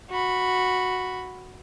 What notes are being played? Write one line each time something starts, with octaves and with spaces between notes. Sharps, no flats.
F#4 B5